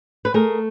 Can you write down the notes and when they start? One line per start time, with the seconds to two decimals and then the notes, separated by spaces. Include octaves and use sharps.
0.25 B4
0.34 A3 G#4 A#4